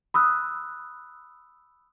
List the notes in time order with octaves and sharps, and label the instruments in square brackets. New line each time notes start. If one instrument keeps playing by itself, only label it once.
[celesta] B5 D#6 E6 F#6